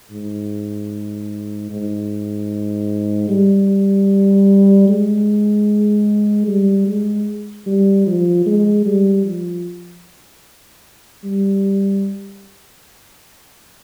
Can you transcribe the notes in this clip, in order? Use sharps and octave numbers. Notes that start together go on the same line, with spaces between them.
G#2
G#2
G3
G#3
G3
G#3
G3
F3
G#3
G3
F3
G3